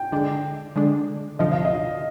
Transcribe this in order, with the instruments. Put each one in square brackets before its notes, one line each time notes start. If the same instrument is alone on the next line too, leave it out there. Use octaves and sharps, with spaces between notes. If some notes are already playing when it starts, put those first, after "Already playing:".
Already playing: [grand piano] G5
[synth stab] D3 G#3 D4
D3 G#3 D4
[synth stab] D2 C3 F3 [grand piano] D#5
[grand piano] F5
D#5